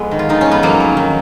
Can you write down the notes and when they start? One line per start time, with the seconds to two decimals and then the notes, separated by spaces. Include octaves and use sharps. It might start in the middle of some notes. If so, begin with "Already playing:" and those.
Already playing: F2 G#3 B3
0.11 D#3
0.19 F4
0.29 D#3 D#4
0.41 F2 C#4
0.51 B3
0.63 F2 F#3 A#3
0.80 D#3
0.97 D#3